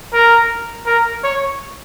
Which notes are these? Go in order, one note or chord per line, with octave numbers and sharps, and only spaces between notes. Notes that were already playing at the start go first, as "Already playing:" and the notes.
A#4
A#4
C#5